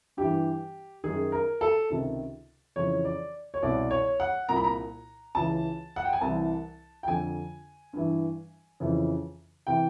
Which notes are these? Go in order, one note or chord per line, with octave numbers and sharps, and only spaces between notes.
G2 E3 G4
F#2 D#3 G#4
A#4
A4
C#2 C3 D#3
F2 C#3 E3 C#5
D5
C#5
C2 B2 D5
C#5
F#5
C2 A#2 A#5
B5
A#5
C#2 C#3 E3 A5
F#5
G5
G#5
C2 C3 E3 A5
G5
F2 D3 G#5
G2 E3
F2 C#3 E3
C3 E3 G5